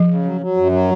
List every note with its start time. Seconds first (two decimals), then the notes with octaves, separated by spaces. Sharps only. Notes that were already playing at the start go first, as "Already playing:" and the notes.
Already playing: F3
0.09 C#3
0.25 F#3
0.41 F#3
0.57 F#2
0.72 F#3